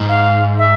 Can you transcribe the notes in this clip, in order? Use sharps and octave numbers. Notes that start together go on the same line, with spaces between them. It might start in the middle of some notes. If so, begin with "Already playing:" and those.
Already playing: G#2
F5
E5